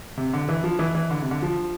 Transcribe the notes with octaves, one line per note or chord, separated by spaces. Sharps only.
C3
D3
E3
F3
E3
E3
D3
C3
D3
F3